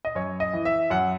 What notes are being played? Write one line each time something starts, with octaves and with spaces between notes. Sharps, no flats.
D#5
F#2 C#5
D#5
E3
E5
F#2 F#5